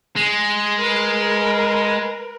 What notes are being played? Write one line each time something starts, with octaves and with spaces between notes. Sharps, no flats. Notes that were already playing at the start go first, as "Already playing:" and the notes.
G#3
A#4 B4